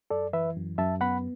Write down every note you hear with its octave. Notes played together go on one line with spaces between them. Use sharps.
F#2 A4 D5
E3 B4 E5
F#2
F#2 E5 A5
B3 F#5 B5